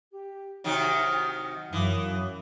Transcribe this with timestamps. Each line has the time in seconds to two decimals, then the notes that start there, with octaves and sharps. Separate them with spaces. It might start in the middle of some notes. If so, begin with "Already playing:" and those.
0.11 G4
0.64 C3 D#3 F#3 E4 D#6 F6
1.73 F#2 E3 F5 D#6